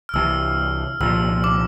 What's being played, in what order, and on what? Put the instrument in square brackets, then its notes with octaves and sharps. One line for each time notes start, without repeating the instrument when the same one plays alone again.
[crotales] F6
[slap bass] C2 C3 E3 [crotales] E6
[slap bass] C2 A#2 F3 [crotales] E6
[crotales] D6